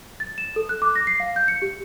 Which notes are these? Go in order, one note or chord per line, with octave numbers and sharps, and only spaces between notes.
A6
E7
A4
F#6
D6
A#6
C7
F5
G6
C#7
G4